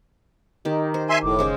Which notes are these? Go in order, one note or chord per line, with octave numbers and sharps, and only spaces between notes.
D#3 D#4 G4
C5
E5 G#5 C6
F#1 A2 D6
C#3 G#3 C5